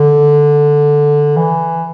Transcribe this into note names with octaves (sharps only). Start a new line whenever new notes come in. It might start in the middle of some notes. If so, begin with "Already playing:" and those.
Already playing: D3
E3